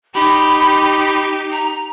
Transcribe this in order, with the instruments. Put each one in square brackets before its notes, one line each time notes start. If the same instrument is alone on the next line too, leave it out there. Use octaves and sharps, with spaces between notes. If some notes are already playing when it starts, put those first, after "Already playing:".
[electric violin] D#4 G4 [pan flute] B5
[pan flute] A#5